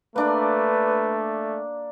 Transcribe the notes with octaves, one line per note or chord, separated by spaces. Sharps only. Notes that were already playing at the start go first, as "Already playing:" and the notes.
A3 A#3 D4 B4 D5